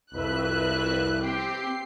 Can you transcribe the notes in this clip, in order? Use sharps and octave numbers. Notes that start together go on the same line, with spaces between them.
C2 F2 B4 E5 F#6
C4 G4 C7